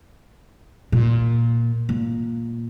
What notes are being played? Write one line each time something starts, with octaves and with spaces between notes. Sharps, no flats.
A#2
A#2